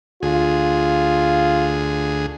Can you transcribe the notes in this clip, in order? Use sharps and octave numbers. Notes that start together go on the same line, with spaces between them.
D2 F4 G#4